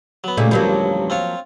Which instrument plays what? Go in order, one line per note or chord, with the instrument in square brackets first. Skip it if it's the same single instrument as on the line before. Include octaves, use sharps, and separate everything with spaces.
[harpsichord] F#3 B3
[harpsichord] C#2 [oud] A#2 G3 A3
[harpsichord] A1 D2 G2 [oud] F3 F#3 A#3
[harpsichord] C4 F4 C#5